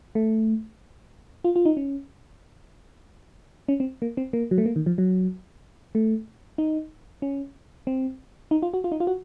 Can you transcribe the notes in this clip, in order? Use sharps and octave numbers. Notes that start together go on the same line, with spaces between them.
A3
F4
F4
D#4
C#4
C#4
C4
A#3
C4
A#3
F#3
A3
A#3
D#3
F3
F#3
A3
D#4
C#4
C4
D#4
F4
F#4
F4
D#4
F4
F#4